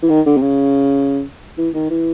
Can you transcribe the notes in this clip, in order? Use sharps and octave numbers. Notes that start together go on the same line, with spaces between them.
E3
D#3
D3
C3
C#3
E3
D#3
E3